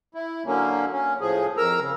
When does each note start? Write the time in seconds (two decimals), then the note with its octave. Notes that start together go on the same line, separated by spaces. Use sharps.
0.14 E4
0.46 D3 F#3 A#3 C#4
0.92 C#4
1.21 A2 F3 G#4
1.57 F2 A#4 A#5 E6
1.80 C#3